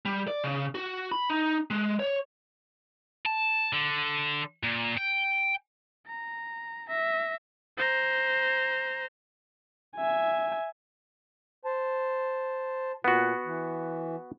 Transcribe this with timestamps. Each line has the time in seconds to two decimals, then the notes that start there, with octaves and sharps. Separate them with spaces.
0.05 G3
0.28 D5
0.44 C#3
0.75 F#4
1.11 B5
1.30 D#4
1.71 G#3
1.99 C#5
3.26 A5
3.73 D3
4.63 A#2
4.97 G5
6.07 A#5
6.89 E5 A#6
7.77 C5 A#5
9.97 E5 G#5
11.65 C5 A5
13.04 A#2 B3 F#4
13.46 E3